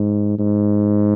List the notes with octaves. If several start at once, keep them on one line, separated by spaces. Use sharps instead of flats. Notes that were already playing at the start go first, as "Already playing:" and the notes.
Already playing: G#2
G#2